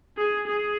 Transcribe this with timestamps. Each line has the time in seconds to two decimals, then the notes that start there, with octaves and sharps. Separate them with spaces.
0.17 G#4
0.46 G#4